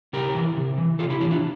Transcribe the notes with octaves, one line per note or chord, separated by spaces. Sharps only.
C3 G4 A#4
E3
C3
E3
C3 F4 A4
E4 G4
E3 E4 G4
D4 F4